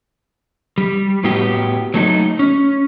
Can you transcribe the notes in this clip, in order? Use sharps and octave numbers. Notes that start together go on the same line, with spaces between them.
G3
A2 B3 F#4 G4
F#3 A3 D#4
C#4